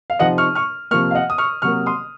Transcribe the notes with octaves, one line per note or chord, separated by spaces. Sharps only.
F5
C3 F3 C4 D#4 D#5 F#5
C#6 F6
C#6 F6
C3 F3 A#3 C#6 F6
F5
D#5 F#5
D#6
C#6 F6
C3 F#3 A#3 C#6 F6
C6 D#6